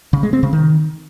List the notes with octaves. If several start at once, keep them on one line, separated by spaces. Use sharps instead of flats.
C#3
G#3
C4
C#3
D#3